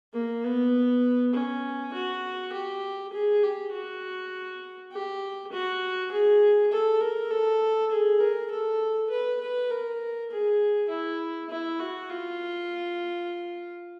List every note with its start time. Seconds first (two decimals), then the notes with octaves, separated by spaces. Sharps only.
0.14 A#3
0.44 B3
1.34 C#4
1.94 F#4
2.53 G4
3.13 G#4
3.43 G4
3.72 F#4
4.92 G4
5.52 F#4
6.12 G#4
6.72 A4
7.01 A#4
7.31 A4
7.92 G#4
8.20 A#4
8.51 A4
9.10 B4
9.41 B4
9.71 A#4
10.31 G#4
10.90 E4
11.50 E4
11.80 F#4
12.10 F4